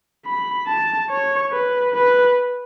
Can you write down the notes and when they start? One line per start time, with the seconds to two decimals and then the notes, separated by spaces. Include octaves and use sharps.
0.26 B5
0.67 A5
1.10 C#5
1.52 B4
1.94 B4